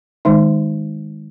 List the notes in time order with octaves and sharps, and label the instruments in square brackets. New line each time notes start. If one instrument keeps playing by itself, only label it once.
[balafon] D#3 G#3 D#4